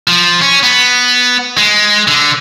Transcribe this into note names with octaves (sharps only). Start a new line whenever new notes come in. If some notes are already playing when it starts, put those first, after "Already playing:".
F3
C#4
B3
G#3
D3